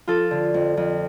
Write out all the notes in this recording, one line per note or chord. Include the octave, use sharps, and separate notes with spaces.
F3 F4 A4
D3
F2
F2